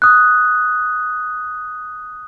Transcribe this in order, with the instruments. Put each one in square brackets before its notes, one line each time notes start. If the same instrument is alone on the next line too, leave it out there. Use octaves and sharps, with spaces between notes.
[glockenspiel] D#6 F#6